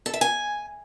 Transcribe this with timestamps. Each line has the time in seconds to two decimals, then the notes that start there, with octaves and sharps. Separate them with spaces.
0.06 A4
0.14 E5
0.21 G#5